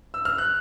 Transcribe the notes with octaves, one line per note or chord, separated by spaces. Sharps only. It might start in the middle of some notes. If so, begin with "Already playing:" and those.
E6
F6
F#6